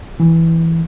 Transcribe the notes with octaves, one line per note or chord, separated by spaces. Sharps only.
E3